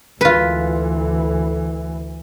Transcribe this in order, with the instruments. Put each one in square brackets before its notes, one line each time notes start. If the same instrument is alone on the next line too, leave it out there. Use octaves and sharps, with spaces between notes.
[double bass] D2 E3 [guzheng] F4 B4